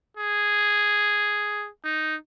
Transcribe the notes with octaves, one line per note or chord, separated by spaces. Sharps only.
G#4
D#4